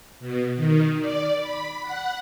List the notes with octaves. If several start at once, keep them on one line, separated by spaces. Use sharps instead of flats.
B2
D#3
D5
B5
F#5